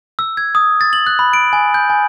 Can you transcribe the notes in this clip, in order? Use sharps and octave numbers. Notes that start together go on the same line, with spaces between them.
E6
G#6
D#6
A6
F#7
F#6
B5
D7
G#5
G6
G#5